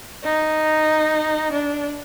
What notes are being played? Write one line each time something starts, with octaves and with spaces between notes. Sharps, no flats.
D#4
D4